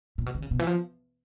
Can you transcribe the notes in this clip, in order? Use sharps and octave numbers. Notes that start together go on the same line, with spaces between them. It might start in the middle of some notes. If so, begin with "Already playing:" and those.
A#2
B2
D3
C#3
B2
E3
F3